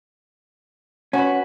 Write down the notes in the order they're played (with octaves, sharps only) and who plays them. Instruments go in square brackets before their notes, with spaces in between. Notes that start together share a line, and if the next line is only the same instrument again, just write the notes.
[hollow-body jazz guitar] C#4 [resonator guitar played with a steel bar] F#4 B4